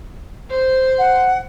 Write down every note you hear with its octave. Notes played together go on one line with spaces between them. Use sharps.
C5
F#5